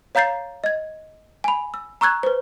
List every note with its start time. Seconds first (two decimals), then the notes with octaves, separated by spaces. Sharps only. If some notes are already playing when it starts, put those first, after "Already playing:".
0.15 C#5 F5 A#5 G6 A6 C7
0.64 D#5 G#6
1.44 G#5 B5
1.74 E6
2.01 A#5 C#6 E6 F#6 G#6
2.23 B4 C5